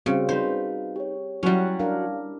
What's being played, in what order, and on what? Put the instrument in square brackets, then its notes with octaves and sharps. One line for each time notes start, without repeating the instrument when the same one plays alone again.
[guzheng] C#3 [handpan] G3 C4 [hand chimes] F#4 F5
[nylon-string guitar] D#4 B4 [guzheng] C5
[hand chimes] G4 C#5
[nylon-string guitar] F#3 F#4 [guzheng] G3 C#4 [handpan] E4
[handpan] D4 A#4 [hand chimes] F5